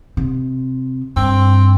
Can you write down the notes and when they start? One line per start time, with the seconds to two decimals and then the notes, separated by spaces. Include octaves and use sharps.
0.17 C3
1.16 G2 C4